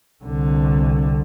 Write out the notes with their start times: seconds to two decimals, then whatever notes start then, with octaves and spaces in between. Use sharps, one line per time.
0.25 C2 D3